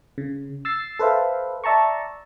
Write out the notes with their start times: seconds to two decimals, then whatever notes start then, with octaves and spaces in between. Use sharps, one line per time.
0.18 C#3
0.65 E6 A6 C7
0.99 A4 B4 C5 E5 F5
1.64 D5 E5 A5 A#5 C#6